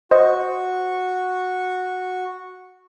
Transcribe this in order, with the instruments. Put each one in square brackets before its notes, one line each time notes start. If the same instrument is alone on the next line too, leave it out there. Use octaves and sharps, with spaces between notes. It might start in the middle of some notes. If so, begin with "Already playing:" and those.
[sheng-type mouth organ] F#4 C#6 [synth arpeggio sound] C5 D#5